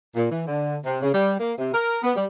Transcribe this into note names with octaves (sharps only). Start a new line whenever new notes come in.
A#2
E3
D3
C3
C#3
G3
A#3
C3
A#4
B3
G3